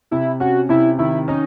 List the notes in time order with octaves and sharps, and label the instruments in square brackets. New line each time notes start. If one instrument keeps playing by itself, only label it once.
[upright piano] C3 [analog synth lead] E4
[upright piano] C#4 [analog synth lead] F#4
[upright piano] C3 [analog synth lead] E4
[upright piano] D#3 [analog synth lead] E4
[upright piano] C#4 [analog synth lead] D#4